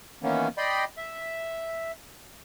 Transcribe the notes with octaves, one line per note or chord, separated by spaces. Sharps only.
D#3 E3 A#3 B3 C#4
D5 D#5 G5 B5 C6
E5